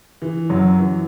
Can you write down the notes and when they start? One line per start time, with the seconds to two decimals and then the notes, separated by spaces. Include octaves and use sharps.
0.22 E3
0.50 F#2 F#3
0.79 E3